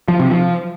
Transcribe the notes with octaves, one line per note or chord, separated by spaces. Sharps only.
F3
C3
F3